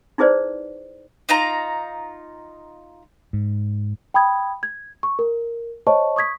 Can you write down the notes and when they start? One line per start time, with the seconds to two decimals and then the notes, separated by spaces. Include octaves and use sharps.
0.18 D#4 E4 G#4 B4 C5 D5
1.29 D#4 F4 A#5
3.33 G#2
4.14 G5 B5 D#6 G#6
4.63 G#6
5.03 C#6
5.19 A#4
5.87 C5 C#5 D#5 A5 C#6
6.16 C#6 D#6 G#6 B6